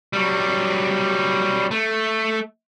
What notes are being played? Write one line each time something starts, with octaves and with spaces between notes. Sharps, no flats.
F#3 G3
A3